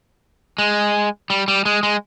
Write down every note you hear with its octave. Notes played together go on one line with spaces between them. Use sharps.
G#3
G3
G3
G#3
G#3